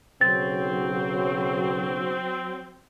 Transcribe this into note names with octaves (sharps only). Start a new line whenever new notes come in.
B1 C#3 F#3 C4 A6